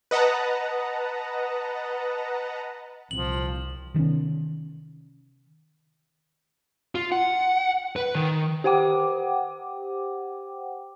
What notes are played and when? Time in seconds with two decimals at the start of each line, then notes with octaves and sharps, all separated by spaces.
0.11 B4 D#5 F#5 A5 A#5
3.11 C2 A#2 E3 F3 C4 F#7
3.94 C3 D#3 B3 C#4
6.95 F4
7.12 F#5
7.96 B4
8.15 D#3
8.64 G4 C5 F#5 G5 D6